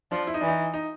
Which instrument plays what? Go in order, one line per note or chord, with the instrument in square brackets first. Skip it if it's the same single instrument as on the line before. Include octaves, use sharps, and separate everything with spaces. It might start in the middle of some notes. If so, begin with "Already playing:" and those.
[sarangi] F3 [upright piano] D4
[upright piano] E4
D#4
[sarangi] E3 [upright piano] D4
[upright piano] D#4
D#4